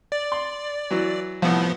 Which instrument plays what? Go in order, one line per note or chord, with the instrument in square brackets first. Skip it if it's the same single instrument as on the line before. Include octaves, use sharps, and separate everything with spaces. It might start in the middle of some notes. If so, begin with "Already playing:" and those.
[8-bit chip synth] D5
[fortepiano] C6
E3 F#3
[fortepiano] C2 A2 [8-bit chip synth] F3 B3